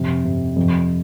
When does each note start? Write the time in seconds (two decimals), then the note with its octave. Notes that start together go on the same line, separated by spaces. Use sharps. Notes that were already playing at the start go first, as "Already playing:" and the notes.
Already playing: F2 C3
0.25 C3
0.56 F2